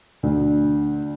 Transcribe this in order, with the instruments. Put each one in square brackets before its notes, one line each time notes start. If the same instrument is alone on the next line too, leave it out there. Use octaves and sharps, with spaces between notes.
[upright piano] D2